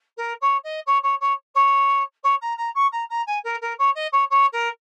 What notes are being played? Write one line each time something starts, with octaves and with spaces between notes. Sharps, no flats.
A#4
C#5
D#5
C#5
C#5
C#5
C#5
C#5
A#5
A#5
C#6
A#5
A#5
G#5
A#4
A#4
C#5
D#5
C#5
C#5
A#4